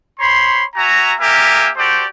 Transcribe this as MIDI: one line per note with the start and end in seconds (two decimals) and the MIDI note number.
0.19 0.63 72
0.19 0.63 73
0.19 0.63 83
0.19 0.63 84
0.76 1.13 66
0.76 1.13 76
0.76 1.13 80
0.76 1.13 82
1.20 1.69 58
1.20 1.69 67
1.20 1.69 70
1.20 1.69 76
1.20 1.69 80
1.76 2.04 66
1.76 2.04 67
1.76 2.04 69
1.76 2.04 72
1.76 2.04 74